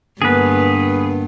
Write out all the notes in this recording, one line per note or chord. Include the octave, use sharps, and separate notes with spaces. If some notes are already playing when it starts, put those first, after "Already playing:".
G2 D3 A#3 B3 G#4 B4